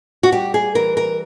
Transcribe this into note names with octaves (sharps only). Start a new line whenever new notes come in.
F#4
G3 G4
G#4
E3 A#4
A#4